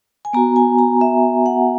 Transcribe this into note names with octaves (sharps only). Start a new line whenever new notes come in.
G#5
B3 F#4 A#5
G#5
A#5
E5
F#5